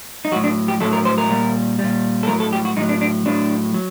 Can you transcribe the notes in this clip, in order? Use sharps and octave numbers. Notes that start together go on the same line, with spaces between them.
D#4
A2 F#3 F#4
D4
G4
A2 F#3 A4
A#4
C5
A#4
A#2 G3
A#2 G3
A4
A2 F#3 A#4
A4
G4
F#4
A2 F#3 D#4
D4
D4
A2 F#3 D4
F#3